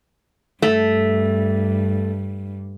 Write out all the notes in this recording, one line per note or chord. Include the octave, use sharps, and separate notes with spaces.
G2 A3